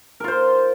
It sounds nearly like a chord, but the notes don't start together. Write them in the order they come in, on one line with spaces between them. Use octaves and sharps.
A#4 F4 C5